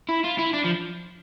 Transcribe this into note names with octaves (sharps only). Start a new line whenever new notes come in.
E4
F4
E4
D4
F3